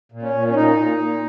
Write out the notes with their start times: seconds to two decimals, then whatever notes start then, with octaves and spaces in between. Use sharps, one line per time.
0.12 A#2
0.22 C#4
0.34 A#2
0.47 C#4
0.54 A#2 D#4
0.77 A#2
0.98 A#2